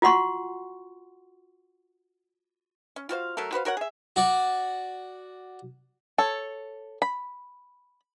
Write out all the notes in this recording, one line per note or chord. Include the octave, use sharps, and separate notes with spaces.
F4 F#4 F#5 C6 C#6
C#4
F4 F#4 C5 F5
F#3 A3 A4 A#4
F#4 B4 C5 F5
F#4 A#4 C#5 F#5
G#4 E5
F#4 D5
A4 C#5
B5